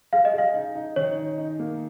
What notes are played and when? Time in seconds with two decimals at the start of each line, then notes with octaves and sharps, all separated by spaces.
0.13 G#4 F5
0.25 D#5
0.34 G#4 F5
0.54 D#4
0.75 D#4
0.96 D#3 C#5
1.17 D#4
1.38 D#4
1.59 A#3